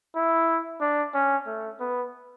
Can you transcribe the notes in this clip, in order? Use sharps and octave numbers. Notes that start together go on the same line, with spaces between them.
E4
D4
C#4
A3
B3